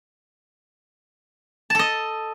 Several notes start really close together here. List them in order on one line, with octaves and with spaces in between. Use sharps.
A5 A4 D#5